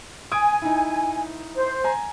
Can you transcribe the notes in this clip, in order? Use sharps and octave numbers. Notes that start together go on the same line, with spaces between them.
G#5 D#6 G#6 D7
D#4 E4
C5
G#5 A#5